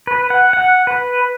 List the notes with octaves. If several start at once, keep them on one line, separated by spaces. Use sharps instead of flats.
B4
F#5
F#5
B4